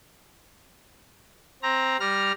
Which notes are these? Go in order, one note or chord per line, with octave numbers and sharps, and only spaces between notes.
C4 A#5
G3 A#5 F6